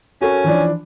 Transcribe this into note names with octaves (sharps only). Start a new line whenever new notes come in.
C#4 F#4 A4 A#4
E3 F3 D4